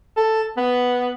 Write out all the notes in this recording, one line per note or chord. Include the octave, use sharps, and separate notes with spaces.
A4
B3